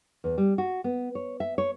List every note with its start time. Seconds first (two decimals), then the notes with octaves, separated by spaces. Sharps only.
0.24 E2
0.38 G3
0.58 F#4
0.84 B3
1.15 C#5
1.40 E5
1.58 C#5